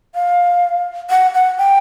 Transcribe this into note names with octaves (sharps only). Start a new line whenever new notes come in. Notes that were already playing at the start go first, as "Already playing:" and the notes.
F5
F#5
F#5
G5